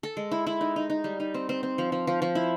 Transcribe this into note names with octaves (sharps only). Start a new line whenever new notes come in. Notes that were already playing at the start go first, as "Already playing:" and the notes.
A4
G#3
E4
E4
D#4
D#4
D#4
G3
D#4
C4
C4
C4
F3
F3
F3
F3
E4